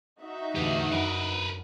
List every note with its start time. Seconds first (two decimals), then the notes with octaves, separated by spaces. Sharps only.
0.21 D#4 F#4 E5
0.55 E2 A2 D3 G4 F5
0.91 F#2 F#3 D4 A#4 B4